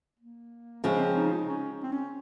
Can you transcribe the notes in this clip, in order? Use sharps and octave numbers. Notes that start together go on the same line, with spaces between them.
A#3
C#3 F3 G#3 C4
C#4
C4
D#4
C#4
C4
C#4